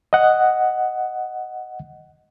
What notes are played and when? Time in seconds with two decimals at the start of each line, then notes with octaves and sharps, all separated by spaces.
0.13 D#5 F#5